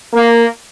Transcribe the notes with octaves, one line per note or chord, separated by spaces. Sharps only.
A#3